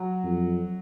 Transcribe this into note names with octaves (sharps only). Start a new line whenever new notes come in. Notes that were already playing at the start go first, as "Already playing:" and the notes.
Already playing: F#3 F#4
F2